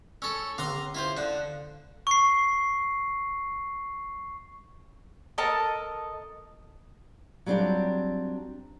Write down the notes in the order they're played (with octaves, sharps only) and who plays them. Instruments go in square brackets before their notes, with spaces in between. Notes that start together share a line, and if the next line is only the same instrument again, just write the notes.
[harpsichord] C#4 A4 [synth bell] E6
[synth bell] D3 C#4 D6 [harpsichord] F5 A#5 C6
[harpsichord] E4 F4 C5
[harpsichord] D3 [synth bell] F5 F#6
[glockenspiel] C#6 C7
[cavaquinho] A4 A#4 D#5 A5
[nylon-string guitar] F#3 G3 C4 D4 F4 G4